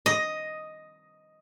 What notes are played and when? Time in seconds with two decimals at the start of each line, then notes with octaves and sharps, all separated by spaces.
0.06 D#5